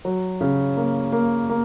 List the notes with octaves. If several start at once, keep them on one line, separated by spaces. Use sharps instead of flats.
F#3
C#3
A#3
A#3
A#3